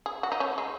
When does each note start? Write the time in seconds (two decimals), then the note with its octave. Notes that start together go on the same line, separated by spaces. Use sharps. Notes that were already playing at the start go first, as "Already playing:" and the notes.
0.06 G#4
0.23 F#4
0.32 D#4
0.40 C#4
0.58 G#3